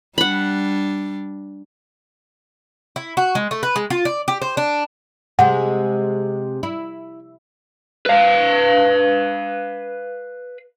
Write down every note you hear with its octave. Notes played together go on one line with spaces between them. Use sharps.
G3 D4 F#5 B5
E4
F#4
G#3
A3
B4
G#3
F4
D5
G4
C5
D4
C3 G#3 F#5
E4
B4 F5